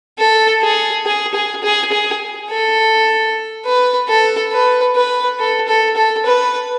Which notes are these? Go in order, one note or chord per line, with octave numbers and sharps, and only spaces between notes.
A4
G#4
G#4
G#4
G#4
G#4
A4
B4
A4
B4
B4
A4
A4
A4
B4